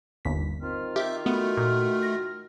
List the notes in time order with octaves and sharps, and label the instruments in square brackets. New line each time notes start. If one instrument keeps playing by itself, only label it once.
[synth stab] G1 D#2 B6
[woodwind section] D#3 F4 F6 [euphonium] C4
[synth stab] G4 [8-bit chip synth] E5
[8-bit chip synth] A3 [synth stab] B3 [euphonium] F#4
[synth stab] A#2
A#6